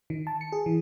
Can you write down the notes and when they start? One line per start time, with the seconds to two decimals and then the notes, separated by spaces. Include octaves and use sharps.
0.10 D#3
0.27 A5
0.41 C#7
0.52 G#4
0.66 E3